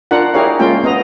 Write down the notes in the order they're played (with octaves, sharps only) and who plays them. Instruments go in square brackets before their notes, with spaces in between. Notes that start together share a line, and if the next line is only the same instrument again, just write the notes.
[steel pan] D4 F4 A#4 F#5
E4 G4 G#4 A#4 C#5 F5
G#3 A#3 C#4 F4 G5
B3 D#5 A#5